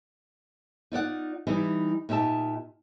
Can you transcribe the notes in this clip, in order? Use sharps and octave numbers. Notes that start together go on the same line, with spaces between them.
D#4 F4 D5 F#5
E3 G3 D#4
A#2 D#4 G4 E5 A5